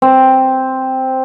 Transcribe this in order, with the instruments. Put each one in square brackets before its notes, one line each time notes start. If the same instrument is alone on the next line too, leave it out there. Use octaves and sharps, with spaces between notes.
[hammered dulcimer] C4